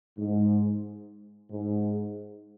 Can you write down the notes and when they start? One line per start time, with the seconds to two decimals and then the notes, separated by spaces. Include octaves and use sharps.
0.17 G#2
1.50 G#2